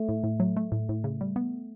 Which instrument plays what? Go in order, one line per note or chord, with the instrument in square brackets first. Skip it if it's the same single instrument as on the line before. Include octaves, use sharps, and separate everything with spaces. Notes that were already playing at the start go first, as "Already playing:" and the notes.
Already playing: [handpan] A3
[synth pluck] A2
A2
F#3
A3
A2
A2
C#3
G3
B3